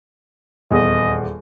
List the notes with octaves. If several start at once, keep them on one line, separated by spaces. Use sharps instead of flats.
D#1 E2 D#5